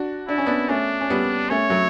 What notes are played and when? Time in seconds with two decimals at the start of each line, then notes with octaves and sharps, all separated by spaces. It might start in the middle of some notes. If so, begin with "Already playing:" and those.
Already playing: D4 F#4
0.28 D4 E4
0.38 C#4
0.46 B3 D4
0.68 A3 C#4 D4
1.01 C#4
1.10 G3 B3
1.50 A3 C#4 C#5
1.70 F#3 A3